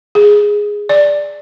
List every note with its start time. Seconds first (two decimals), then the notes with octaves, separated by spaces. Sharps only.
0.15 G#4
0.89 D5